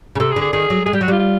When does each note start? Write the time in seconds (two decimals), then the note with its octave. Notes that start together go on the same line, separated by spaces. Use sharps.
0.15 C#3
0.20 C3 A4
0.31 G#4
0.36 D3
0.42 G#4
0.53 D#3 G#4
0.70 F#3
0.86 G#3 G#4
0.93 G3 G4
1.01 F#3 F#4
1.08 G3 F4
1.19 F4